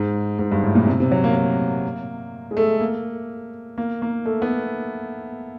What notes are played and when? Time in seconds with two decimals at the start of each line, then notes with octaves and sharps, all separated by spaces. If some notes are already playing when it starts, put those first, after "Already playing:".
Already playing: G#2
0.39 G#2
0.52 G2
0.63 A2
0.75 A#2
0.87 C3
1.00 C3
1.12 F#3
1.24 A#3
1.35 A#3
2.51 G#3
2.57 A3
2.81 A#3
3.78 A#3
4.02 A#3
4.26 A3
4.42 B3